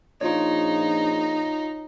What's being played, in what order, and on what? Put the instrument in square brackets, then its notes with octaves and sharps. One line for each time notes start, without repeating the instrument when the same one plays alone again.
[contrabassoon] A#1 [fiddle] D#4 [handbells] F4 C#5